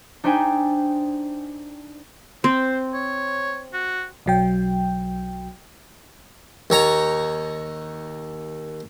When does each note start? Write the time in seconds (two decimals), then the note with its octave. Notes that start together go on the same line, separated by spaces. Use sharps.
0.24 D4 D#4 C5 E5 G5 G#5
2.44 C4 C5
2.94 C#5
3.73 F#4
4.26 B1 F#3 G5
6.70 D#2 C#5 A#5